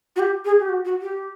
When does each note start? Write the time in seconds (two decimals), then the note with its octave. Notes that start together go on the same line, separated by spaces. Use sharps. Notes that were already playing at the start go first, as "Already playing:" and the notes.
0.16 F#4
0.20 G4
0.45 G#4
0.59 G4
0.69 F#4
0.85 F#4
1.02 G4